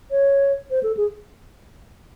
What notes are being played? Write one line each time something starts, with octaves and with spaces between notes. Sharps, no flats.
C#5
C5
A4
G#4